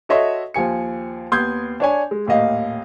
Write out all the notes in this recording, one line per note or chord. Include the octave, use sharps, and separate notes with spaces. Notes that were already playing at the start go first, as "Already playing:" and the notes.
F#4 A4 C#5 D#5 E5 C6
D#2 F3 G#5 C#7
D#2 B3 C6 D#6 G6 G#6
D4 C#5 G#5
G#3
D#1 A2 A#3 D#5 F5